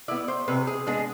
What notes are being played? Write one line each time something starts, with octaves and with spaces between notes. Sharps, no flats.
B3 E4 D5
C5
C3 B4
G#4
G#3 B3 D4 G#4